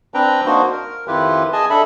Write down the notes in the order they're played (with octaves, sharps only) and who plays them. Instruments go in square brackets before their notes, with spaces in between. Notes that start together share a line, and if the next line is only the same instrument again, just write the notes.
[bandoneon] C4 D4 B4 G5 A#5
A#3 D4 D#4 F#4 C5
A#4
F2 D#3 E4 F4 G4 B4
G#4 D#5 G#5 A5
D4 A4 E5 B5